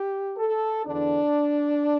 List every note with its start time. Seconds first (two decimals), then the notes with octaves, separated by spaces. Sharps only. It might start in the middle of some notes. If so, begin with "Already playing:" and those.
Already playing: G4
0.36 A4
0.85 E2 D3 D4